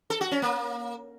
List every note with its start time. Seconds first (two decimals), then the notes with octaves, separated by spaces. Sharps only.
0.10 A4
0.21 F#4
0.31 C#4
0.42 A#3